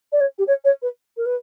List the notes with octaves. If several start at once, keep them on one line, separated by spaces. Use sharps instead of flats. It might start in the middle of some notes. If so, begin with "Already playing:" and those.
D5
C#5
G4
C#5
C#5
B4
A#4
B4